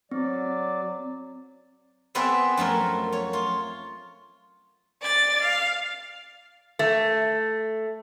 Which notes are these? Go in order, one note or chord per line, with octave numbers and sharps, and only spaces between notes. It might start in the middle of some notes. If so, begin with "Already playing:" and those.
F#3 C4 D5
B3 C4 G#4 B4 D5 E5
F#2 F3 A3 A#4
C#5
F4
D5 A6
F5
A3